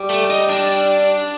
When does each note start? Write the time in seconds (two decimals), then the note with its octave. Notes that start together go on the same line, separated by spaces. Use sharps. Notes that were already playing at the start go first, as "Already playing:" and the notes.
Already playing: G3
0.09 A3
0.30 D#4
0.49 D4